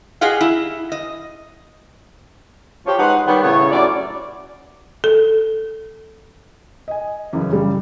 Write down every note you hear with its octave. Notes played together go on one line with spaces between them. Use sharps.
G4 G#4 D#5 F5 F#5
E4
D#5
F3 G4 C#5
G#3 D#4 B4 C5 F#5
D#3 G3 B3 B4 C#5 D5
A2 C#3 B3 C#5
A2 F#3 C#4 E4 D5
A4
D#5 G#5
F#2 C#3 E3 C#4
C#3 G3